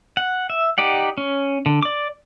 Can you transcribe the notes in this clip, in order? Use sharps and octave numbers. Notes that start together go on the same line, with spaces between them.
F#5
E5
D#4 G4 D5 F#5
C#4
D3
D5 D6